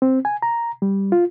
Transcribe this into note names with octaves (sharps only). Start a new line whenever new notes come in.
C4
G#5
A#5
G3
F4